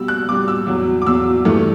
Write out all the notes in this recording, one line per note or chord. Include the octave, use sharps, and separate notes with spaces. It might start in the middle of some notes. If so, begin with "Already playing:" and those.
Already playing: B2 G3 E6
F#6
B2 G3 D6
E6
E2 B2 F#3
D6
E2 B2 F#3 E6
G2 E3 A3